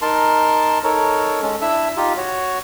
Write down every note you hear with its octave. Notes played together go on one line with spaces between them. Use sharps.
D#4 A#4 A5 C6
D#4 A4 A#4 C#5
G#3 C#4 A4
D4 E4 E5 E6
D#4 F4 G4
F#4 C#5